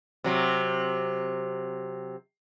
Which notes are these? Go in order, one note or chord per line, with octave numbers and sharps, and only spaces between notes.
C3 F#3